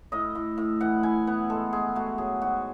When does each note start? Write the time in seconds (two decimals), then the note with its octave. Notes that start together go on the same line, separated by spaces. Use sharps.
0.12 A2 D#5
0.35 A2
0.58 A2
0.81 E3 F#5
1.03 E4 G#5
1.27 B3 F#5
1.50 G#3 A4
1.73 G#3 G#4
1.96 A3 F#4
2.18 F#3 G#4
2.41 G#2 F#4